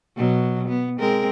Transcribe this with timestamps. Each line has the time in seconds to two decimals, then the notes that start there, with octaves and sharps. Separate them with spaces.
0.17 B2 F#3
0.68 B3
0.99 G#3 C4 A#4